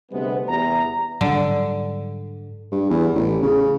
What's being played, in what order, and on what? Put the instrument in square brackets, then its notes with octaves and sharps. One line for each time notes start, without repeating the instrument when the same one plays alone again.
[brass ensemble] D2 C3 G3 G#3 B3
E2 C3 A#5
[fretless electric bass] G#2 F#3 G3 [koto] D3
[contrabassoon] G2
E2
A1
C#3